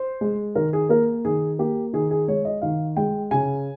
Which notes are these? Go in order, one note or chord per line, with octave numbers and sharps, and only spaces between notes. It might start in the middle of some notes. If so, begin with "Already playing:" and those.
Already playing: C5
G#3
D#3 A#4
G#4
A#3 A#4
D#3 G#4
A#3 G4
D#3 G#4
G#4
G#3 C#5
D#5
D#3 F5
G#3 G5
C#3 G#5